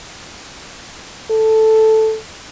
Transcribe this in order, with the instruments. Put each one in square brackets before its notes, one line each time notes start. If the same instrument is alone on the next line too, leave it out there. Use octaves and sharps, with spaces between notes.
[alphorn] A4